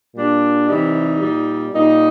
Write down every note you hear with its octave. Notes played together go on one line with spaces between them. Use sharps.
A#2 G3 D4
C3 E3 G3 D#4
A#2 G3
A#2 G3 D#4